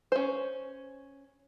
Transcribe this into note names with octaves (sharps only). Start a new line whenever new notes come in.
C#4 C5